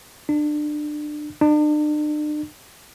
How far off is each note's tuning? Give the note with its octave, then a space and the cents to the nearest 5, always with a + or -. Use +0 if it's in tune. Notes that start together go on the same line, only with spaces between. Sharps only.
D4 +25
D4 +40